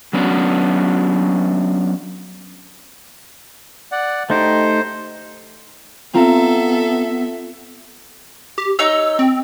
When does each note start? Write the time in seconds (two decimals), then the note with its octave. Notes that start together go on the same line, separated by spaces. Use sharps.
0.13 F#3 B3 C#4 D4 E4 F#4
3.92 D5 F#5
4.30 A3 D#4 G4 C5
6.14 B3 C4 F4 A4 E5 A#5
8.58 G4
8.79 D#4 C#5 E6
9.19 C4